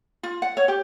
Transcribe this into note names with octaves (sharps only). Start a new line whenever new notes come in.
F4
F#5
C#5
G4